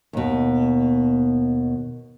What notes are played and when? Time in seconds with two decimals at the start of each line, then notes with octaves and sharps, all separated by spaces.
0.13 D#2 B2